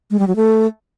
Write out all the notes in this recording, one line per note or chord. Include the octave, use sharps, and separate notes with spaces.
G#3
G3
F#3
A3